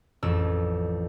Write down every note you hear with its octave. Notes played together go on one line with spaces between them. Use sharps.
A1 F2 E6